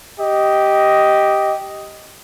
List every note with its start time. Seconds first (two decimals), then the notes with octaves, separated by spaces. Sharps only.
0.20 G4 D#5